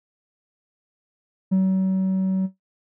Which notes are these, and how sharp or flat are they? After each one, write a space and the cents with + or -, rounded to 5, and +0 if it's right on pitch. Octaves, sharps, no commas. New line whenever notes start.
F#3 +40